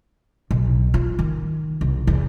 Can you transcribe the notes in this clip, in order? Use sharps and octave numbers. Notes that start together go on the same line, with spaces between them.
B1
F4
D#3
C2
E2